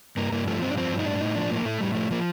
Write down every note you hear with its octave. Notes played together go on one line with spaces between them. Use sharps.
G2 A#3
G2 A#3
F3 A3
G2 C4
D4
F3 C4
G2
D#4
A2 D4
A2 D#4
F3 D4
A2 A#3
A2 A3
A2 G3
F3 A3
F3 A#3